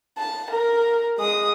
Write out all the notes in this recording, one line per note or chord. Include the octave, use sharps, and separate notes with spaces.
A5
A#4
G#3 D#6